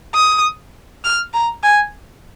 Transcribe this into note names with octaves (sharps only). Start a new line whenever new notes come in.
D#6
F6
A#5
G#5